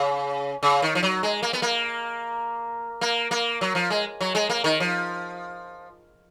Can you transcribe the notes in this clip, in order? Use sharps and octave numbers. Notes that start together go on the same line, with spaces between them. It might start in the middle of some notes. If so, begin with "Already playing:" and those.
Already playing: C#3
C#3
D#3
F3
F#3
G#3
A#3
B3
A#3
A#3
A#3
F#3
F3
G#3
F#3
G#3
A#3
D#3
F3